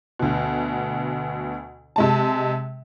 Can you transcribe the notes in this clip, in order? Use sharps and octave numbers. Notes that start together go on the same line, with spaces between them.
D2 B2
C3 G#3 A5